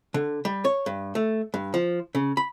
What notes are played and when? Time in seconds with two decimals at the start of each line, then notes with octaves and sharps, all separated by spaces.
0.14 D3
0.45 G3
0.65 C#5
0.86 G2
1.15 A3
1.54 G2
1.74 F3
2.15 C#3
2.37 B5